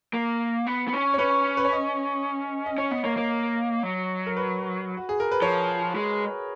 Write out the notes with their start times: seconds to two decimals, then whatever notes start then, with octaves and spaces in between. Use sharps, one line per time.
0.14 A#3
0.67 B3
0.88 B3
0.93 C#4
1.14 C#5
1.19 C#4 B4
1.57 B4
1.65 C#5
1.73 D#5
2.66 D#5
2.78 C#4 C#5
2.91 B3 D#5
3.04 A#3 C#5
3.12 D#5
3.17 A#3 C#5
3.83 F#3
4.26 A#4
4.37 B4
4.97 F#4
5.09 G#4
5.20 A#4
5.32 B4
5.42 F3 C#5
5.95 G#3